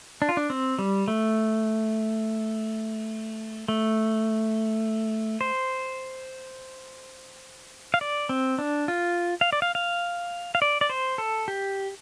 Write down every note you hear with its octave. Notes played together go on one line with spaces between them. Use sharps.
D4
F4
D4
C4
G3
A3
A3
C5
F5
D5
C4
D4
F4
F5
D5
F5
F5
F5
D5
D5
C5
A4
G4